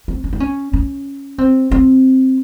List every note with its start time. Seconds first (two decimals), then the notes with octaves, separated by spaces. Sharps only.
0.08 C4
0.24 C#4
0.33 D#4
0.40 C#4
0.73 C#4
1.38 C4
1.71 C4